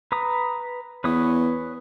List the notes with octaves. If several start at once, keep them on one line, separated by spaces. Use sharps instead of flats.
B4 A#5 D#6
E2 B4 C#5 D#6